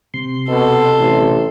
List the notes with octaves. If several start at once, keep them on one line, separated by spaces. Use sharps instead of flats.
C3 C6
B2 A4
A1